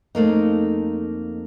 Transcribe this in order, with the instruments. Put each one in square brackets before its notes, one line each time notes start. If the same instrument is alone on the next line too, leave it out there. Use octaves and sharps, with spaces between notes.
[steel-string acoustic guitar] F2 A3 A#3 D#4